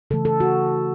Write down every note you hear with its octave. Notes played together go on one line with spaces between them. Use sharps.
C#3 E3 A3 A4
A4
F#4